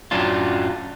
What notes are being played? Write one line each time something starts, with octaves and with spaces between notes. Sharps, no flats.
F#2 A2 F#3 C#4 D4 F4